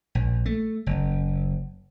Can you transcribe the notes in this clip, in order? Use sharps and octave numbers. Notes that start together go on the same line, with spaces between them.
A#1
A3
F#1